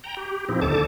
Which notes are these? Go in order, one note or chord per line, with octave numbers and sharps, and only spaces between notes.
G5 A#5
G4
A#2 F3 C4 D#4 E4
D#2 D3 A4 A5 D6